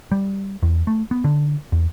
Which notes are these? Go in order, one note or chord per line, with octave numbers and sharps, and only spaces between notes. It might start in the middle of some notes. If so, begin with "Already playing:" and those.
G3
E2
A3
B3
D3
E2